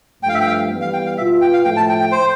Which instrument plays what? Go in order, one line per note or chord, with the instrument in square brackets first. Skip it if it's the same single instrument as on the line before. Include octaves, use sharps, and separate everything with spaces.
[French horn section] G2 F3 A3 [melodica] G5
[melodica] F5
E5
G5
F5
[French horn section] E3 G3 B3
[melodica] F5
G5
F5
[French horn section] B2 B3 F4 [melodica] E5
[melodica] G5
F5
[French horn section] A2 F3 A3 [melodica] G5
[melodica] A5
G5
G5
C5